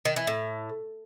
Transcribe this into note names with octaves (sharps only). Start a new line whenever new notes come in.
D#3
E3
A2